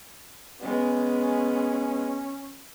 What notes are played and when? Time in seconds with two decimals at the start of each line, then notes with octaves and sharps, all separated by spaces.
0.60 G#3 B3 C#4